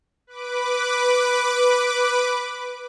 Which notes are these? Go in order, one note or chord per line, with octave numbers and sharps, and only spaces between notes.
B4 D6